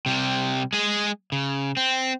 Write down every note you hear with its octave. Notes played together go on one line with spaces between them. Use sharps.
C3 G3
G#3 G#4
C#3
C4